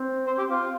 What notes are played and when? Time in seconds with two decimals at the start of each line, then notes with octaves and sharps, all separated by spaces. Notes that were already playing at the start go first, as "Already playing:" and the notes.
Already playing: C4
0.27 C5
0.38 G4
0.50 F4